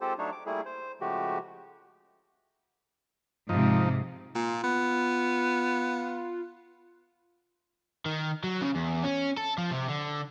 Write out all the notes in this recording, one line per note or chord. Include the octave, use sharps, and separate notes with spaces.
G#3 C4 F4 G4 A4 C5
F#3 A3 D4 D#4 C#5
D6
G3 A3 A#3 E4 G#4
C5
C#3 F3 G#3 A3 F#4 G4
G#2 C3 F3 D#4
A#2 F4
B3
D#3
F#3
C#3
E2
C#4
A4
F3
C3
D3